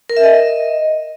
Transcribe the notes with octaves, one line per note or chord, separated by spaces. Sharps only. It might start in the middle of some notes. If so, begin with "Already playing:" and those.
A#4
E5
D#5